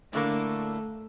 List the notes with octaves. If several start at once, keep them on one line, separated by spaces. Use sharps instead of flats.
A2 D3 A3 A#3